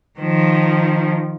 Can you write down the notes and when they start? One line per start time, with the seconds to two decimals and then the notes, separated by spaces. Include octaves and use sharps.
0.20 D#3 F3